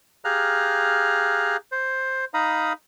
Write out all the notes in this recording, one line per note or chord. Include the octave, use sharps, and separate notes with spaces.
G4 G#4 F5 A#5 F6 F#6
C5
D#4 F5 A#5 B5 D#6